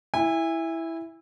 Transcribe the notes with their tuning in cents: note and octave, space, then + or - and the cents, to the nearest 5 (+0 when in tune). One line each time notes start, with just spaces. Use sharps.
E4 +0 G#5 -35